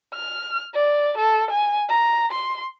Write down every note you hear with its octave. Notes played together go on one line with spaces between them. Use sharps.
F6
D5
A4
G#5
A#5
C6